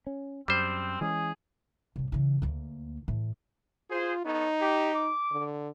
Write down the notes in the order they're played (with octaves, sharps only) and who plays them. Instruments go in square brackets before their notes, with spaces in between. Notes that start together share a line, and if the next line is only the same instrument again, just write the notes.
[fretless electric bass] C#4
[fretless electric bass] F#2 [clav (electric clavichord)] G3 C5 [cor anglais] C4
[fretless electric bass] E3 G#3 C#4 [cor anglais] G#4
[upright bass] C2 A2
C#3 E3
D2 A#3
A2 E3
[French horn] F4 [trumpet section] G#4 C5
[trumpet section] B3 A4 C#5 [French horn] D#4
[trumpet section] G4
D6
[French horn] D3